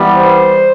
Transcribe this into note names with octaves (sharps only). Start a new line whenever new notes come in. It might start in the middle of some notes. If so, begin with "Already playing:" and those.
Already playing: E3 G3 B3
C5